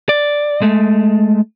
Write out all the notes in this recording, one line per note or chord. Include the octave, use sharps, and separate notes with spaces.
D5
G#3 A3